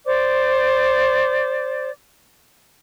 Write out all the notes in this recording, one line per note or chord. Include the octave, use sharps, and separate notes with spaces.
C5 D5 D6